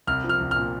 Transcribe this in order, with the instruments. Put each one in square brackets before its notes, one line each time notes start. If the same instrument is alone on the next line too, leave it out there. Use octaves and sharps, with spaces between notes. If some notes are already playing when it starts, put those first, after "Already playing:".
[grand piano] C2 F6
F3
F6
C2
A#2 F6